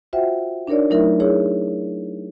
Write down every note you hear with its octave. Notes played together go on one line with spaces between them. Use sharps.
F4 F#4 C5 E5 F#5 G5
D4 D#4 A#4 C#5 D5
F#3 A3 D#4 E4 A#4 E5
E4 G#4 C#5